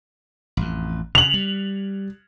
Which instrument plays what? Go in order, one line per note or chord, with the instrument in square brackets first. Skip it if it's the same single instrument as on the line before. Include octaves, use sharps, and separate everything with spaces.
[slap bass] A1 F2
[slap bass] C#3 [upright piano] F7 F#7
[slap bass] G3